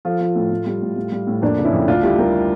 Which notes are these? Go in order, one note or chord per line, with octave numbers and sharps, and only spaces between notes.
F3 F4 A4
F3
A2
A2
G3
A2
G3
G3
A2
F2 A#3 D4
C#3
C#4 E4
F2
D2 D4 F4
G3 E4 G4
G3 G4 A#4